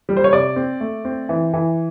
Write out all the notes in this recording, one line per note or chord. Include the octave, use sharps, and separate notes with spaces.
G3
C5
C#5
C3 D5
C4
A3
C4
E3
E3